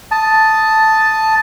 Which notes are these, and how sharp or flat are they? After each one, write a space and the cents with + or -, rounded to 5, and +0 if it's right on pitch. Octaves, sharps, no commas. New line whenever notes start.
A5 +0 D#6 +0